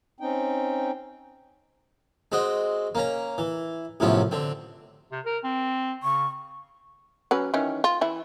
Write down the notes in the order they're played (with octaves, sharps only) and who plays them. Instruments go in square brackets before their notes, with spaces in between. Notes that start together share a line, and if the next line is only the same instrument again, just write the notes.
[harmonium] C4 C#4 D#4 G5
[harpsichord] G#3 C4 F#4 D#5
A#3 C#4 A#5
E3
F#2 A2 C3 F3 B3 C#4
D3 C4
[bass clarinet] C3
A#4
C4
[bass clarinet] C#3 [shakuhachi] C#6
[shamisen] F#3 C#4 B4
D#3 E3 C#4
F4
E3 E4